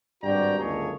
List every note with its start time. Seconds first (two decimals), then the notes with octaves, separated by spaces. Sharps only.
0.23 G#1 G2 F#4 D5 G5 A#5
0.60 F#1 C#2 D3 A#3 G#4 C#5